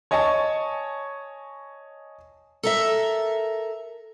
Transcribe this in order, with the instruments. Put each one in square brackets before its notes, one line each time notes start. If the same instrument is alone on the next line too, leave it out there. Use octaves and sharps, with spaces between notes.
[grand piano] C#5 D#5 G#5 A5 C#6
[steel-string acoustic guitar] A4 A#4 E5